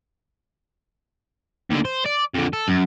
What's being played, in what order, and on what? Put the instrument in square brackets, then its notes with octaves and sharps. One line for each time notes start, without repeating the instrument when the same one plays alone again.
[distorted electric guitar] D#2 D3
C5
D5
F2 D3
A4
F#2